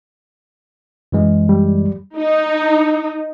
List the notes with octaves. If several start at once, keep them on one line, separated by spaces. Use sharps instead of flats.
F#2 E3 G#3
G3
D#4